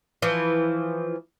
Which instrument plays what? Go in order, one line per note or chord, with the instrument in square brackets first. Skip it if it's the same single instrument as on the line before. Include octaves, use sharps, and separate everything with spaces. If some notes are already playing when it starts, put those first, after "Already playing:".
[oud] E3 F3